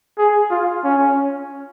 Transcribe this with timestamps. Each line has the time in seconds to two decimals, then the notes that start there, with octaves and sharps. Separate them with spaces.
0.18 G#4
0.50 F4
0.84 C#4